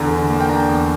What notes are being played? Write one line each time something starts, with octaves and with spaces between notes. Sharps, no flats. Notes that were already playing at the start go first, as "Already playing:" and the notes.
Already playing: E2 D3 A#5
D3
A#3
G5
D4 A#5
E2